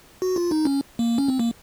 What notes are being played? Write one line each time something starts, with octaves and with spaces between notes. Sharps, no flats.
F#4
F4
D#4
C#4
A#3
C#4
C4
A#3